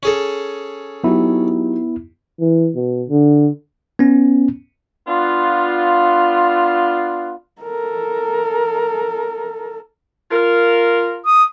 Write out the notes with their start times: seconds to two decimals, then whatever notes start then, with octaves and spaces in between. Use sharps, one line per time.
0.03 C#4 G#4 A4
1.04 F#3 B3 D#4 E4 G4
2.41 E3
2.75 B2
3.09 D3
3.99 B3 C#4
5.08 B3 D4 F4
7.62 A4 A#4
10.31 F4 A#4
11.25 D#6